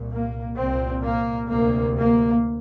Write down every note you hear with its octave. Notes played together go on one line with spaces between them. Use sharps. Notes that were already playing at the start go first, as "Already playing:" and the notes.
Already playing: C2 A#2
A#3
C2 A#2 C4
A#3
D2 C3 A#3
A#3